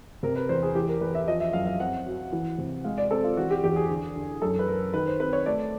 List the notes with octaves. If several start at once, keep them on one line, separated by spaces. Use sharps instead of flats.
C3 A#4
B4
E2 C5
G#4
E3 G4
A#4
E2 B4
E5
F3 D#5
E5
F#2 F5
F5
C4 F#5
F#3
E3
C3
G#3 F5
D5
C4 A4
F4
E3 F#4
G4
E2 G4
G#4
D3
D3
F#2 A4
B4
F#2 A#4
D#3 B4
C5
C4 B4
C#5
A3 D5